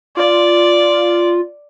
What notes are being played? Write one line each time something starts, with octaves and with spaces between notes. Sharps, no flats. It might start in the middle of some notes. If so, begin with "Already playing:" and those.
F4 D5